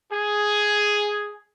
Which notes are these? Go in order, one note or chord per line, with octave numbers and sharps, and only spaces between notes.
G#4